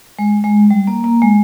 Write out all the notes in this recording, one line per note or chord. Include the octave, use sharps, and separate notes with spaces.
G#3
G#3
G3
A#3
A#3
G#3